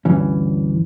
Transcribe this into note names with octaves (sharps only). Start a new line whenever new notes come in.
D2 G2 E3 C#4